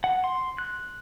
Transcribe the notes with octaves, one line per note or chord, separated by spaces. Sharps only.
F#5
C6
F#6